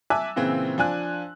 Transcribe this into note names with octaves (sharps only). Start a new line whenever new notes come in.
E5 G#5 A5 D6 E6 F#6
A#2 C#3 E3 C4
F3 D4 G#5 F#6